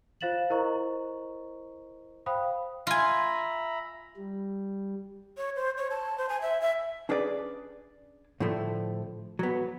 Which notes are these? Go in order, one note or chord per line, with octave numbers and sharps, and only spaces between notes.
F4 C5 F5 A6 E7 F#7
E4 A#4 C5 D#5 A#5 C#6
C5 F5 G5 B5 D#6
F4 E5 G#5 A#5 B5
G3
C#5
C5
C#5
A5
C5
G#5
E5
E5
C#4 D4 G#4 B4 D5
A2 D3 F3 A3
F#3 B3